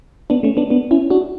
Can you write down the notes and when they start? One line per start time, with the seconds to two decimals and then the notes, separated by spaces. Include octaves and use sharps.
0.30 B3 D4
0.43 A3 C#4
0.57 B3 D4
0.70 B3 D4
0.91 C#4 E4
1.10 D4 F#4